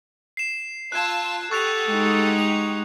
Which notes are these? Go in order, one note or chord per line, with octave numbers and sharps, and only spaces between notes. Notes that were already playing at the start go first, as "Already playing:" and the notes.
C7 E7
F4 A5 E6 F#6 G#6
G4 A4 F#5 C#6 D#6 F#6 F7
G#3 D#4
F7